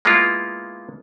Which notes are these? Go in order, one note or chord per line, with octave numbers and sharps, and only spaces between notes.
G#3 A#3 B3 E4 F4